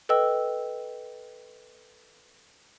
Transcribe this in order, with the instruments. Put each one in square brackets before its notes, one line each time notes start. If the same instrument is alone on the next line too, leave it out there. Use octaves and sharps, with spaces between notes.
[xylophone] A4 B4 D#5 G5 E6